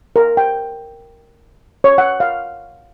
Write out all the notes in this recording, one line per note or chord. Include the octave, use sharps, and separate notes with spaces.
A#4
G5
C#5
F#5
F5